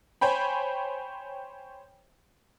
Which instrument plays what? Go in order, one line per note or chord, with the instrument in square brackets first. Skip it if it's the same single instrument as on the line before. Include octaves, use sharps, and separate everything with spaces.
[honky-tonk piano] C5 C#5 G5 G#5 B5